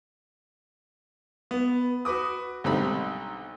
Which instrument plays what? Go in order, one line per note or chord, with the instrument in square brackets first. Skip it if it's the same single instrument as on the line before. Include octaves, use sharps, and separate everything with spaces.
[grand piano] B3
F#4 B4 D6 D#6
[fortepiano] B1 D3 G3 C4 D#4 B5